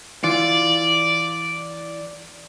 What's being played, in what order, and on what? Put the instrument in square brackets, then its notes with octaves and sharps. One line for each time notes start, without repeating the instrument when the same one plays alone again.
[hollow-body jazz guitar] E3 F4 [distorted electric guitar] D5